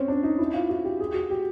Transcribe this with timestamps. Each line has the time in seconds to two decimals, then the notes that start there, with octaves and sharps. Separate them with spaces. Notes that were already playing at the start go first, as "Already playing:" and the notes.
Already playing: C4 C#4
0.08 D4
0.23 D#4
0.39 E4
0.54 F4
0.69 F#4
0.84 G4
1.00 G#4
1.14 F#4
1.30 G4